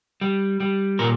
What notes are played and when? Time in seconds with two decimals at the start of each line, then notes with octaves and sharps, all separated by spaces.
0.21 G3
0.60 G3
0.99 A#2 A#4